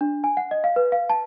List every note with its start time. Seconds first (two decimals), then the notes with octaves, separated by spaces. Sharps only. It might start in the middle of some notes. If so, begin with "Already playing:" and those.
0.01 D4
0.24 G#5
0.37 F#5
0.51 D#5
0.64 F5
0.76 B4
0.92 F5
1.10 A5